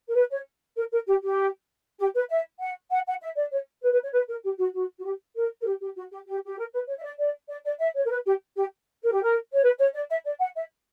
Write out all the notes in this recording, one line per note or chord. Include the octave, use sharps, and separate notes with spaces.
A#4
B4
C#5
A#4
A#4
G4
G4
G4
B4
E5
F#5
F#5
F#5
E5
D5
C#5
B4
B4
C#5
B4
A#4
G4
F#4
F#4
F#4
G4
A#4
A#4
G4
G4
F#4
G4
G4
G4
A#4
B4
C#5
E5
D5
D5
D5
D5
E5
C#5
A#4
B4
G4
G4
A#4
G4
A#4
C#5
B4
C#5
D5
E5
D5
F#5
E5